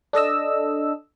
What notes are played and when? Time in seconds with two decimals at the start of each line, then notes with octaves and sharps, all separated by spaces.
0.13 D4 A4 D#5 E6